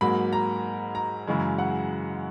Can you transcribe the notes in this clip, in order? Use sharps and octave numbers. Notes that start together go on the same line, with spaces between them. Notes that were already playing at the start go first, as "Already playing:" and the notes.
G#2 F#3 A#3 B5
A#5
A#5
F#2 C#3 E3 G#3
F#5